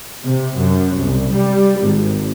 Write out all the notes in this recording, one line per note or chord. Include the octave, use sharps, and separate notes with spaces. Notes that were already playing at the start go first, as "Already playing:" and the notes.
C3
F#2
C2
G3
G#1